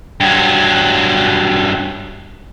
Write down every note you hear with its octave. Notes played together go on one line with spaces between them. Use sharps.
G2 F#3